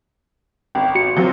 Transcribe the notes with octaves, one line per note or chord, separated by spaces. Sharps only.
G#1 G5
F#4 C#7
F3 F#3 C4